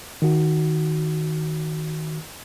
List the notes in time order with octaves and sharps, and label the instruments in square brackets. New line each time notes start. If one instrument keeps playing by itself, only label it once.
[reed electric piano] D#3 F#4